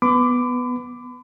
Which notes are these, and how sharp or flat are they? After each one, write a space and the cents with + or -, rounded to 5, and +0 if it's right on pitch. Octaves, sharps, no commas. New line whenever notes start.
B3 +0 B5 +40 D6 +0